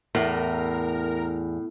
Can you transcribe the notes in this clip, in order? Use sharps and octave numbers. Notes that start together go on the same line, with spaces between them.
E2 A2 A#4